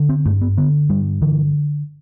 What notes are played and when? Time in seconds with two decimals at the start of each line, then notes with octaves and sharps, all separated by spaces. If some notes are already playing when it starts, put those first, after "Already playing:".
Already playing: D3
0.09 C4
0.25 G2 A3
0.41 B3
0.57 D3 B3
0.89 G2 G3
1.22 D3 E3